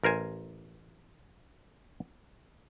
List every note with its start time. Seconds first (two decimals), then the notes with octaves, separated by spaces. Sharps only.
0.04 A1 A#4 C5 G#5